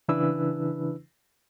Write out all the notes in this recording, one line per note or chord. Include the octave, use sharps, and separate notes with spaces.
C#3 E3 D4 E4 B4 E6